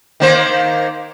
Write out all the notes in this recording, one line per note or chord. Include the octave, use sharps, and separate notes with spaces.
D#3 A#3 C5